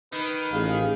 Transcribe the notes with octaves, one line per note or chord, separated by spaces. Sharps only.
D#3 B4
A1 G#4 F5